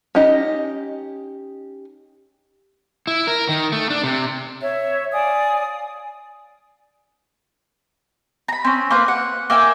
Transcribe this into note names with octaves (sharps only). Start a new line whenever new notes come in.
C#4 D#4 G4 D#5
E4
A#4
D#3
A3
D4
C3
C#5 E5
D5 F5 G#5 D#6
A#5 B5
C4 C#4
A#3 C4 B4
F#5
A#3 E5 G5 G#5